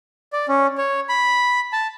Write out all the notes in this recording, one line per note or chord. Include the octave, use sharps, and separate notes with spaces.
D5
C#4
C#5
B5
A5